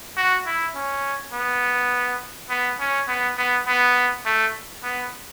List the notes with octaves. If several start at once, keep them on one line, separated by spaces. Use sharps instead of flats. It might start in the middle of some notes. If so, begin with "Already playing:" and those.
F#4
E4
C#4
B3
B3
C#4
B3
B3
B3
A3
B3